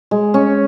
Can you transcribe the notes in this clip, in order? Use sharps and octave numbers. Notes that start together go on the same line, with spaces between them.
G#3
C#4